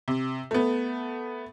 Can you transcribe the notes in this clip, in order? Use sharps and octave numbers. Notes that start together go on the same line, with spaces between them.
C3
A3 B3